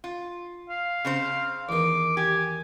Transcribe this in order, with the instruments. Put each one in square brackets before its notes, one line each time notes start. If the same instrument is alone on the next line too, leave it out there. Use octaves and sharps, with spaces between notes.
[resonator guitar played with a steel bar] F4
[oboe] F5
[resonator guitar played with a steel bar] C#3 C4 C5
[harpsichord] E2 D#3 [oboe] D6
[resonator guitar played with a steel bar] G4 [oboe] G#5